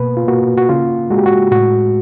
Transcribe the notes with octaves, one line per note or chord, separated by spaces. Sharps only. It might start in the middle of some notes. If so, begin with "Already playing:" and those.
Already playing: B2 A#3 B4
F4
A#3 F#4
F#4
C#3 F4
G#3 F#4
G4
F#4
A2 F#4